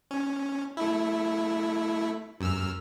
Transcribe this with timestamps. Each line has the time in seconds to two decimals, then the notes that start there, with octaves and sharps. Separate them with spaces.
0.11 C#4
0.77 A3 E4
2.41 F#2 E6 F6